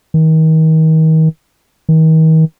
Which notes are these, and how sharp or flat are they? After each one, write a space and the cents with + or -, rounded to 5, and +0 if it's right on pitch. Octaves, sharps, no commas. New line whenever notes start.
D#3 +35
D#3 +40